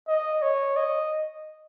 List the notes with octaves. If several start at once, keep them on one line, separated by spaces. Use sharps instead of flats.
D#5
C#5
D#5